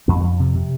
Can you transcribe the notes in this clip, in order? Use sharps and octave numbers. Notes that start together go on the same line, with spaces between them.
F2 C4
F2
C3
C3